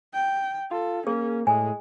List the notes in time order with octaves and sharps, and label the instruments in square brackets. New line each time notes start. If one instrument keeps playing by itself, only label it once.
[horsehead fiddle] G5
[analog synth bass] F4 [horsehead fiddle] A4
[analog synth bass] A#3 [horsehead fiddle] C#4 [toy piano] G#4
[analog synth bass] A2 [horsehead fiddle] G#3 [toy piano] G#5